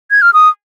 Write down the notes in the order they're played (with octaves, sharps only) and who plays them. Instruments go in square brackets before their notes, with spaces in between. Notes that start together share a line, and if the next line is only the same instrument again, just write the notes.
[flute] G#6
F6
D#6